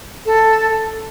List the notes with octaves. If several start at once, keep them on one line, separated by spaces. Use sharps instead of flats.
A4